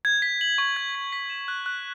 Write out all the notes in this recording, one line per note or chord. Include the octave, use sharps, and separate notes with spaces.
G#6
B6
F#7
C#6
G#6
B6
B6
E7
F#6
F#6